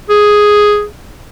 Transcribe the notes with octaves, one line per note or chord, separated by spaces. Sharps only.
G#4